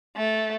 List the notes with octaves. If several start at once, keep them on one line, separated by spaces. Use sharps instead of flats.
A3